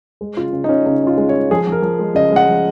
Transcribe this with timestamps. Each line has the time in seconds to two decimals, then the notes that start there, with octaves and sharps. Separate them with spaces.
0.21 G#3
0.37 C#3 F4
0.53 C#3
0.64 D#4
0.69 C#4
0.86 C#3 D#4
1.02 C#4 F4
1.17 G#3
1.29 C#5
1.34 G#3
1.51 F3 G#4
1.67 F3
1.72 A#4
1.82 F3
1.99 G#3
2.15 C#3 D#5
2.32 G#3 F#5
2.48 F3